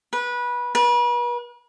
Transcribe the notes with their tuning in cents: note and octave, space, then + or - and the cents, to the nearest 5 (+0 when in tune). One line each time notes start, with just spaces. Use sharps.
B4 -20
B4 -40